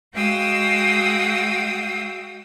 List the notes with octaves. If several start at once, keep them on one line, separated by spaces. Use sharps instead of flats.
G#3 F#4 F5 G5 D#6 E6